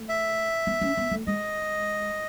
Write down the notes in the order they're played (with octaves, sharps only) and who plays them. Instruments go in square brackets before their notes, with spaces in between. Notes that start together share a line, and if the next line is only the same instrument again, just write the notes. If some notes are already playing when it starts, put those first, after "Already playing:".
Already playing: [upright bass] A3
[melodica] E5
[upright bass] B3
C#4
B3
A3
[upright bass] G#3 [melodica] D#5